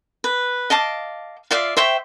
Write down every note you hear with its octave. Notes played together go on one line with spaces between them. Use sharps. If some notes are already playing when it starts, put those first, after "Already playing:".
B4
D#5 F5 A5 D6
F4 D5 E5 F5
C5 E5 G5 C#6